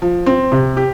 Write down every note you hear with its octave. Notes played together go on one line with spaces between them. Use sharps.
F3
C4
C3
G4